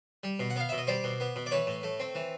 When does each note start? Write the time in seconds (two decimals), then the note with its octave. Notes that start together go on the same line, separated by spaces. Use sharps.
0.23 G3
0.39 B2
0.50 F#5
0.56 B3 F5
0.69 B2 E5
0.78 D#5
0.87 G3 C5 D5
1.04 B2
1.20 B3
1.36 B2
1.46 D5
1.51 E3 B4 C#5
1.67 A2
1.83 A3
2.00 C4
2.15 E3